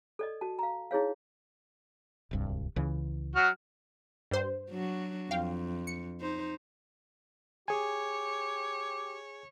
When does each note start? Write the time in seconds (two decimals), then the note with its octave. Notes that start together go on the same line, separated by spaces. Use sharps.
0.19 A4 D5 D#5
0.41 F#4 A5
0.59 F5 A#5
0.91 D#4 E4 G#4 C#5 F5
2.31 D1 C2 G2
2.76 C#2 C#3 E3
3.36 F#3 F#4 F6
4.31 G2 C5
4.70 F#3 D4 F#4
5.31 F2 F5 G5
5.87 C#7
6.21 D#4 C5
7.68 G4 G#4 C#5 G#5